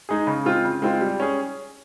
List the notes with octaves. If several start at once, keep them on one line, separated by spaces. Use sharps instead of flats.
G#3 D#4 G#4
C#3
G#3 C4 F4
C#3
G#3 C4 F4
G3
C#4 G#4